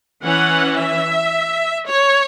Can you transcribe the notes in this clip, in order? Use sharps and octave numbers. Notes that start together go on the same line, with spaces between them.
E3 C#4 F#5
E5
C#5